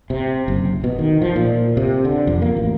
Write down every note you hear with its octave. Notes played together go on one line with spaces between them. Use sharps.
C3
F#1
B2
D#3
F3
A#2
C3
D3
F2
A#3
A1